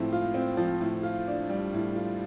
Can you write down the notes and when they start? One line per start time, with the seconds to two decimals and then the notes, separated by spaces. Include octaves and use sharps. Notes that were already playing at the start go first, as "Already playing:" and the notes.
Already playing: A2 F3 C4
0.12 F4
0.34 C4
0.57 F3
0.81 A2
1.03 F4
1.27 D4
1.49 G3
1.73 A2
1.95 F4